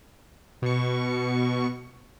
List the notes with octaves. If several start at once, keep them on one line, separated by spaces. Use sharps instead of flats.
B2 C#6